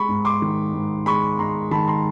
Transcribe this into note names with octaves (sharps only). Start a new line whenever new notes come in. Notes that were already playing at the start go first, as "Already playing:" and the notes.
Already playing: G#3 B5 C#6
G#2
C6 D6
D#3
G#2
G#3 B5 C#6
G#2 A#5 C6
D#3 A5 B5
A#5 C6